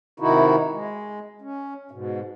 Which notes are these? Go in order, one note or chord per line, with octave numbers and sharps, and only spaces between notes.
C3 D#3 D#4 E4 F#4
G#3
C#4
G#2 B2